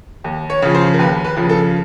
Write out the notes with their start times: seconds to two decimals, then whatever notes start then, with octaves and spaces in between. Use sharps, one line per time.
0.24 D#2
0.50 C#5
0.62 C#3 F3
0.75 C5
0.94 A#4
0.99 D#2 B4
1.25 B4
1.37 C#3 F3
1.49 A4